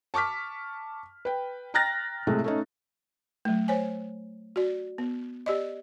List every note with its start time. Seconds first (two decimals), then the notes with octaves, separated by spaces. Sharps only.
0.14 A5 C#6 D6 F6 B6
1.25 B4 G5
1.74 G5 A#5 F6 F#6 A6 A#6
2.27 A2 C3 G#3 A3
2.44 A3 C#4 D#4
3.45 F#3 A3
3.68 C5 C#5 G#5
4.56 F#4 D5
4.98 B3
5.46 G4 D5 D#5